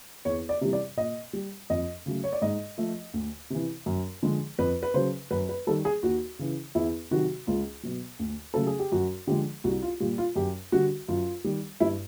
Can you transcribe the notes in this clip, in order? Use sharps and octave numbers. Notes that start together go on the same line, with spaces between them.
E2 C#5
D5
C3 E3 G3
D5
A#2 D#5
G3
F2 D#5
C#3 F#3 A3
C#5
D5
G#2 D#5
F3 A3
D2
C3 E3
F#2
D3 F3 G#3
F2 B4
B4
C#3 F#3 C5
F#2 B4
B4
D#3 G3 A4
G#4
D#2 F#4
C#3 E3
E2 E4
C3 D#3 F#3 F#4
C#2 F4
B2 F#3
D2
C#3 F#3 A3 A4
G#4
G4
F#2 F#4
D3 F3 G#3 G4
C2 F#4
F4
A#2 G3 F4
F4
F#2 G4
D3 G3 F#4
F#2 F4
D#3 G3
G2 E4